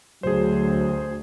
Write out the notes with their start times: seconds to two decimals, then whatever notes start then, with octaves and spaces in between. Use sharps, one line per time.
0.23 D2 F#3 G#4 C5